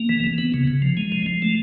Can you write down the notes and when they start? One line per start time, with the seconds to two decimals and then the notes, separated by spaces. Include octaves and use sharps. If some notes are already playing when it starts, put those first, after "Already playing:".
Already playing: A#3
0.09 E3
0.24 E3
0.38 B3
0.54 C#3
0.67 C#3
0.82 F3
0.97 G#3
1.12 F3
1.26 F3
1.42 A3